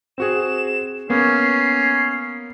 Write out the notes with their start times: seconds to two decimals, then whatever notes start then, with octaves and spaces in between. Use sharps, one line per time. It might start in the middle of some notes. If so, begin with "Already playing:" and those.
0.18 C4 F#4 G#4 E7
1.10 A#3 B3 C#4 C7